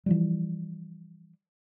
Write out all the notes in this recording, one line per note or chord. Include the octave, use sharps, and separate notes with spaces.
E3 F3 G3